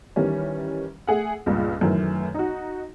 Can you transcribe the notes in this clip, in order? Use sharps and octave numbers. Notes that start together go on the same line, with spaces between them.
D#3 E3 G3 C#4
A3 G#4 F#5
C#2 G2 A#2
F#2 A2 D#3 E3
D#4 F#4